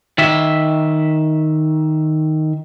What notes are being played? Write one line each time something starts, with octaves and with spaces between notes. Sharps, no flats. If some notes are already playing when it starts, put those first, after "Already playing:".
D#3 E5